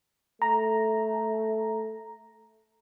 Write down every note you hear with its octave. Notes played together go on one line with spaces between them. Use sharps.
A3 A#5